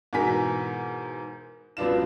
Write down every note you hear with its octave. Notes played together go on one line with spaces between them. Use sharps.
G#2 B2 E3 A#4 G#5 B6
C#2 F#3 B3 D4 F4 E7